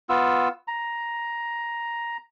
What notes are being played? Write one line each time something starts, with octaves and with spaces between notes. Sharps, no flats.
B3 F4 E6
A#5